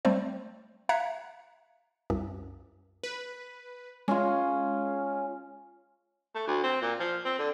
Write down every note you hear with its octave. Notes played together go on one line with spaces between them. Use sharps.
G3 A3 C4 C5 D5
E5 F5 A#5 F#6 G#6 C#7
C2 F#2
B4
G#3 C#4 F4
A3
D2
C4
A#2
F3
C4
D3